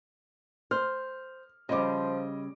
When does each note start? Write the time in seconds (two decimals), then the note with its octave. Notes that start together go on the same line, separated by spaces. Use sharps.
0.71 C5 F6
1.69 C#3 F3 G3 D#5 B5 D6